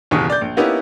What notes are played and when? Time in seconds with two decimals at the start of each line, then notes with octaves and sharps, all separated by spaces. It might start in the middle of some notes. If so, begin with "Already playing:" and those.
0.11 F#1 D#2 B2 E3 C#6 D#6
0.30 D5 G6
0.41 A#1
0.57 A#3 B3 C#4 D#4 E4 G4